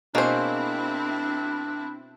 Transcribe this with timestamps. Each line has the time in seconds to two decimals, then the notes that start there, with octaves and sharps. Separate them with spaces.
0.15 B2 A#3 C4 D4 E4 G#4 C5 C#5